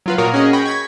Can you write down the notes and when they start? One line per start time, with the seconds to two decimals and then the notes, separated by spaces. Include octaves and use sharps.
0.06 F#3 F4 B4
0.18 A#2 F#4 A#4 C#5 D#6
0.34 C#4 F#4 G#4 D#5
0.53 G5 B5 C#6 A#6
0.66 C#6 G#6 B6